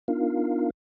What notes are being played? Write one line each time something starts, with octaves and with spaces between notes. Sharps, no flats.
B3 D4 D#4 F4 A#4 F5